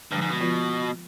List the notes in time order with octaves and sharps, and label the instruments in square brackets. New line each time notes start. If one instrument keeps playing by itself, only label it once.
[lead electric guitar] G2 [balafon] D3 F3 G#3
[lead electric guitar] G#2
B2
[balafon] F3 B3 F4 B4 D5